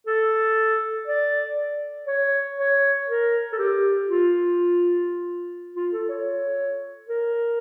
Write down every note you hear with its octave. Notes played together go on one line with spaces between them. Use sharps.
A4
D5
C#5
C#5
A#4
A4
G4
F4
F4
A4
C#5
A#4